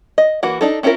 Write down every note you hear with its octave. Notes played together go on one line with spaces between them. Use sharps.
D#5
E3 A#3 F#4
D4 D#4 A4
C4 C#4 E4 F4 A#4